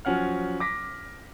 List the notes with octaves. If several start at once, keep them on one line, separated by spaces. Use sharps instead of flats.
F3 F#3 C#4 F#5 F6
D6 A#6 B6